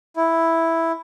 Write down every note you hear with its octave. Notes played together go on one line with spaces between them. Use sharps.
E4